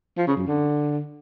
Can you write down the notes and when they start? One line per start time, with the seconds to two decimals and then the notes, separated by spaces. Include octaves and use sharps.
0.18 F3
0.27 C#3
0.37 F#2
0.47 D3